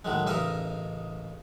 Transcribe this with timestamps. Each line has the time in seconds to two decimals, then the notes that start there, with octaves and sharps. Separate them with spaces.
0.05 A2 D#3 F#3 G#3
0.27 A1 C#3 D#4 A#4 D#5 E5